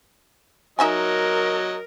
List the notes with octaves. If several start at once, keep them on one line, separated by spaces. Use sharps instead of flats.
F#3 D#4 A#4 D#5 E5 G#5